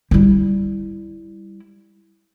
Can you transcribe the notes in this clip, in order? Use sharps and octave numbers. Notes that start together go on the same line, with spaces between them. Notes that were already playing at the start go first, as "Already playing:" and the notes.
G3 E4